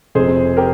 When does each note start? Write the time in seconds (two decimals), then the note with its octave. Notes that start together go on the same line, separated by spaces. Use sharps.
0.15 F1 F2 C3 G#4 C5
0.57 G4 A#4